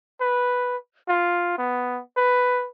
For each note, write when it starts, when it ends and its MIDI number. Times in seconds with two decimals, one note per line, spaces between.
0.21 0.77 71
1.09 1.58 65
1.58 2.00 59
2.17 2.67 71